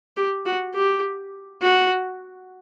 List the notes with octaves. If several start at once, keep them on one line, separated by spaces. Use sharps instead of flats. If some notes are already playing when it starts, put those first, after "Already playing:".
G4
F#4
G4
F#4